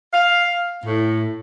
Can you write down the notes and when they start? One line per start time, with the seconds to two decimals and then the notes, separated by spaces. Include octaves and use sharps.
0.13 F5
0.86 A2